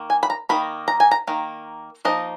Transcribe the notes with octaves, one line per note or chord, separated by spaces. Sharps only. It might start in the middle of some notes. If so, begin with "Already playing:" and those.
Already playing: D#3 A#3
G#5
B5
A#5
D#3 A#3 D#4 B5
A#5
G#5
A#5
D#3 A#3
F3 A#3 D#4 D#5